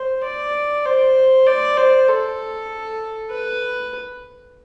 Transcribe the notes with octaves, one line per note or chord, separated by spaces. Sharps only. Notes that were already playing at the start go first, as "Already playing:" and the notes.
Already playing: C5
D5
C5
D5
C5
A4
B4